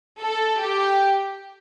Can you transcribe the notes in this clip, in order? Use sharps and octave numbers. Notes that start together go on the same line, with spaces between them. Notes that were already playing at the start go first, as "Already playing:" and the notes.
A4
G4